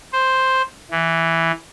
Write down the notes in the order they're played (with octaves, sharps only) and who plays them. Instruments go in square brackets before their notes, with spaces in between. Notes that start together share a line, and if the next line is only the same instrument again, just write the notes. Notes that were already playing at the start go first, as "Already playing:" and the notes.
[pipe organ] C5
E3